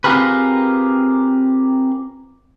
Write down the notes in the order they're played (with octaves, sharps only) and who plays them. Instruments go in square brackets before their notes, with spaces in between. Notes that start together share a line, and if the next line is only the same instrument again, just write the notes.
[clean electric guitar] C4 F4 G4 G#4 A#4 B4